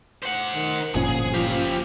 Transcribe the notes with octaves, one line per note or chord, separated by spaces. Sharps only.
C5 F#5
D#3
G1 A#2 F3 C#4 G#4
F3 G4 F5